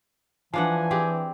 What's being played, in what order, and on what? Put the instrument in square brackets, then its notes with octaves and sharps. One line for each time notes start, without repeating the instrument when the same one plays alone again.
[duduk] E3 [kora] F3 D4 F#5 [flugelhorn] G#5
[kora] C4 G4 G#4